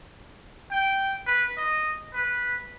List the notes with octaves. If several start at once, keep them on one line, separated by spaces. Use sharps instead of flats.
G5
B4
D#5
B4